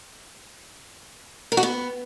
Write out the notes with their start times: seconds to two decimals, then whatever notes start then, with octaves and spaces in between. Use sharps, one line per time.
1.52 A#4
1.57 F#4
1.63 B3